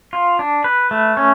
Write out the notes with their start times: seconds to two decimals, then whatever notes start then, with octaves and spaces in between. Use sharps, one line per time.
0.13 F4
0.39 D4
0.64 B4
0.91 A3
1.17 C#4